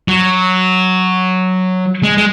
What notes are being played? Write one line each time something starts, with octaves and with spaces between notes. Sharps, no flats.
F#3
G#3
G#3